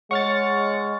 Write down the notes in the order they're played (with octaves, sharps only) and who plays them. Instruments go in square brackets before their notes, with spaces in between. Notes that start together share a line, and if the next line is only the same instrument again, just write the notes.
[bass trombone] G#3 [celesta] C#5 [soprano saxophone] F#5 [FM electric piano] C#6 F6 A6